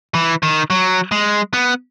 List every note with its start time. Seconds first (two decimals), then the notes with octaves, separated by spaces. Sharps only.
0.14 E3
0.43 D#3
0.70 F#3
1.11 G#3
1.53 B3